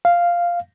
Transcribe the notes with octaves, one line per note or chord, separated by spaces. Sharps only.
F5